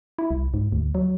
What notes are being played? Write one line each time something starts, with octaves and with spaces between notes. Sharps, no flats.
E4
C2
G#2
D2
F#3